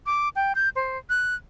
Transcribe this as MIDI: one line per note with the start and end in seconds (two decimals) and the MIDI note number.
0.06 0.29 86
0.36 0.53 79
0.55 0.69 91
0.76 0.98 72
1.10 1.35 90